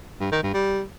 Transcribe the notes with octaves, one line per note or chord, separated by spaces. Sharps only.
G2
D#3
G2
G3